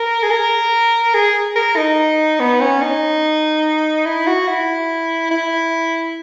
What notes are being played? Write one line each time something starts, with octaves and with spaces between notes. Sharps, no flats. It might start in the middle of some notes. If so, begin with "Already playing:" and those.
Already playing: A#4
G#4
A#4
G#4
A#4
D#4
B3
C#4
D#4
E4
F#4
E4
E4